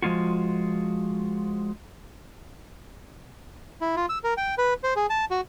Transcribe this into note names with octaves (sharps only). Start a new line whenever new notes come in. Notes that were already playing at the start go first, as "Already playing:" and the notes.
F3 G#3 F4 F#4
E4
F4
E6
A#4
G5
B4
C5
G#4
A5
F#4